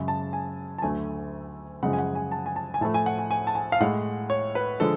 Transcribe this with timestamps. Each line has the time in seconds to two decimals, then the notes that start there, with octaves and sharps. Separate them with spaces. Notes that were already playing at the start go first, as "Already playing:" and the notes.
Already playing: F#2 C#3 G#3
0.08 A5
0.33 G#5
0.78 A5
0.82 D2 D3 F#3 A3 G#5
1.83 F#2 C#3 F3 G#3 F#5
1.93 G#5
1.99 F#5
2.15 G#5
2.32 A5
2.46 G#5
2.56 A5
2.74 G#5
2.81 A2 F3 A3 A5
2.94 G#5
3.06 F#5
3.19 G#5
3.31 G#5
3.47 A5
3.55 G#5
3.72 F5
3.80 A2 G#3 F#5
4.30 C#5
4.55 B4
4.80 D3 F3 G#3 A4